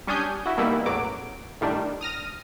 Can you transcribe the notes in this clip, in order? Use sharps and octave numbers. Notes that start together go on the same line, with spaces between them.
G3 C#4 D4 G#5 D#6 G6
E4 F#4
B2 D#3 E3 G3 A#3 E4
A1 E2 F#3 D6
A2 D#3 G3 D4
D#6 F6 A#6 D#7